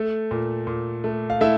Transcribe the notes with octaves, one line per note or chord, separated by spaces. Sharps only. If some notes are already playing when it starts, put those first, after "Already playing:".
Already playing: A3 A4
A#2
A#2
A3
F5
A3 E4 E5